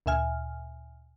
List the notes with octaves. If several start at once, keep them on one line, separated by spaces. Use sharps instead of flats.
D2 A#2 E5 G#5 F6